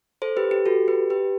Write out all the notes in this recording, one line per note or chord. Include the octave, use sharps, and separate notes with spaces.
A4 C5
G4 B4
G4
F#4 A4
G4 B4
G4 B4